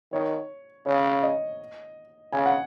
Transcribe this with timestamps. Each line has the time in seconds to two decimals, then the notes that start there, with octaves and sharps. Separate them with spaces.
0.13 D#3 C#5
0.86 C#3 C#5
1.23 D#5
2.32 C#3 G#5
2.46 F#5